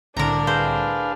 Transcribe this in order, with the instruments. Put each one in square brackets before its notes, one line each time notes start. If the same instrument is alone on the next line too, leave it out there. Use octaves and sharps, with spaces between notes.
[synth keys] C2 A2 D3 [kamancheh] D4 [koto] A#4 A#5
[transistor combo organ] G#4 B4 F5 [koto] C5